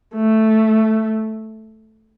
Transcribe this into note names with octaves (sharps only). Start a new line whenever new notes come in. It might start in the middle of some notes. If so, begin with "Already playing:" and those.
A3